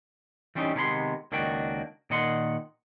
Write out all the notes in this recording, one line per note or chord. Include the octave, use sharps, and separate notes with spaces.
E3 G3 C4 C#4 D#4
C3 D#3 G#3 B3 A#5 C6
C#2 D#3 A#3 D4 F#4 G5
A#2 D#3 D#5 F#5 C6